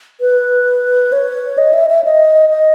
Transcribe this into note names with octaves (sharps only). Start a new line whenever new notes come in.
B4
C#5
D#5
E5
E5
D#5
D#5